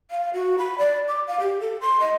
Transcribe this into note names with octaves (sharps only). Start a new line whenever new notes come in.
F5
F#4
B5
D5
D6
F5
G4
A4
C6
D#5